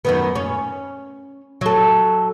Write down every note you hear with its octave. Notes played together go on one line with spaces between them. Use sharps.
F#2 D#3 B3
C#4
F#3 A4